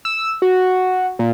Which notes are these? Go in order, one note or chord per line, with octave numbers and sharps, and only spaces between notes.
E6
F#4
A#2